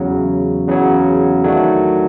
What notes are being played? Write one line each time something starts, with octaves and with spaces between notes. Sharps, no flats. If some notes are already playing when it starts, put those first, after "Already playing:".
Already playing: E2 C#3 F#3
E2 C#3 F#3
D#3 F#3 A3 D4